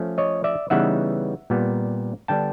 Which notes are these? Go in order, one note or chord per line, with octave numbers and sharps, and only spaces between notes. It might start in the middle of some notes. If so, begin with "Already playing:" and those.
Already playing: F3 A3 C#4
C#5 D#5
D5 E5
C#3 E3 G3 B3 D#4 E5 F#5
A#2 G3 B3
D3 G3 B3 D4 G5 A5